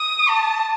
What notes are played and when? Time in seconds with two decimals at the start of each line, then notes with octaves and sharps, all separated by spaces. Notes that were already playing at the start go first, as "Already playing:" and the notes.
Already playing: D#6
0.29 A5